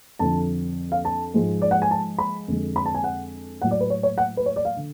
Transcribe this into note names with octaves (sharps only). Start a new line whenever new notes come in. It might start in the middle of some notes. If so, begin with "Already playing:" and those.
F2 D3 F3 A5
F5
A5
G#2 F3 G#3
D5
F#5
G#5
A5
B5
F2 D3 G#3
B5
A5
G#5
F#5
A2 F#3 F#5
D5
B4
C#5
C#5
F#5
B4
C#5
D5
F5
D3